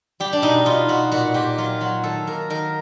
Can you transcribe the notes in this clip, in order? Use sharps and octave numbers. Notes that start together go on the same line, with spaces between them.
G3 G4
D4
B2 D#4
B2 F4
B2 F#4
A#2 F#4
A#2 G4
F#3 F4
F#3 F#4
D#3 A4
A#3 A#4
D#3 A#4